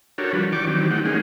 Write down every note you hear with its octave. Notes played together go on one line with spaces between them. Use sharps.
D4 F#4 G4 A4 A#4 C#5
F3 G3 D4 F#4 B4
E3 D5 G5 C#6 D6
D#3 E3 F#3 C4 G4
A3 D#4 F#5 G5
G#3 A#3 C#4 D#4 G#4